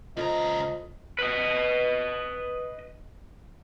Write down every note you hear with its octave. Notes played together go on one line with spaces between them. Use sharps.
C#2 F4 A4 C5 D#5 A#5
B4 D#5